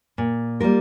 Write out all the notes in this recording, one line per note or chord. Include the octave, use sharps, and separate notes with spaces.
A#2
G3 A#3 F4 A#4